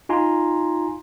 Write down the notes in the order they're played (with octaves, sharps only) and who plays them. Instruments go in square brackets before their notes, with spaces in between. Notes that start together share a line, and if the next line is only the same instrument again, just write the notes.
[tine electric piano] D#4 F4 G#5 A#5 C6